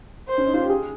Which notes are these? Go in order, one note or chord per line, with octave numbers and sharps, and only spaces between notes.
C5
C#4
D#4
F4
G4
G#4